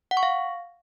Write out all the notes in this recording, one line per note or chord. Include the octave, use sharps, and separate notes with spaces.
F#5
C#6
F5